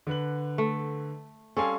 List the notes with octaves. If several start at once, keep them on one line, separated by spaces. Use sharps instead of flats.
D3 B4 F#7
A3
G3 C4 C#4 A4 F5 G#5